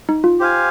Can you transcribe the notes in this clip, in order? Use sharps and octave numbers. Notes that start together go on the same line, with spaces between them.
D#4
F4
G4 C5 F5 G#5